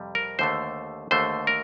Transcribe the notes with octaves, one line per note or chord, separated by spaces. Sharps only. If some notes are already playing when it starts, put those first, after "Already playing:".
Already playing: F2 C3 G3
A#4
D#2 D3 A3 C5
D#2 D3 A3 C5
A#4